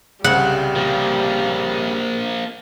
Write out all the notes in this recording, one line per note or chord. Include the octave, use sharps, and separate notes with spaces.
C2 C#3 G3 F#5
F3 A#3